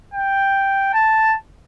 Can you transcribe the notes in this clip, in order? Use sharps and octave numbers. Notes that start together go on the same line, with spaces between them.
G5
A5